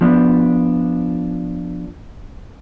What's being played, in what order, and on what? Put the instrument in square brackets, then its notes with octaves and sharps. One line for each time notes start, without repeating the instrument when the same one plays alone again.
[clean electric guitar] F3 B3 D4